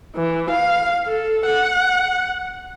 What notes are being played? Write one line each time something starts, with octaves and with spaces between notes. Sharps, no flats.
E3
F5
A4
F#5